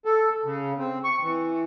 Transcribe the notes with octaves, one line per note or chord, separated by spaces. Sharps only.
A4
C#3
C4
C#6
E3